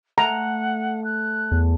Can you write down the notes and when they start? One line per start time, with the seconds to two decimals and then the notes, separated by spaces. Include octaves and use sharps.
0.18 A3 F#5 A#5
1.04 F#6
1.51 E2